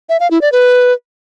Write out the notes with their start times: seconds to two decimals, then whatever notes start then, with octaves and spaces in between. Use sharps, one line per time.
0.09 E5
0.20 F5
0.31 E4
0.41 D5
0.52 B4